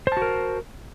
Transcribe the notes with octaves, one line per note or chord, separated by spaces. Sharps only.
F#4 A#4 C5 A5